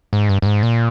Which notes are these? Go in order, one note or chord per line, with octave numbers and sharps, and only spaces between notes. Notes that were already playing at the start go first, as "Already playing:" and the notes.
G#2
G2
G2
G#2
A#2